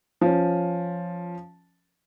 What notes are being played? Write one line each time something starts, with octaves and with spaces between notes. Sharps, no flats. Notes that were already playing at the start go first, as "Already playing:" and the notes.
F3 C#4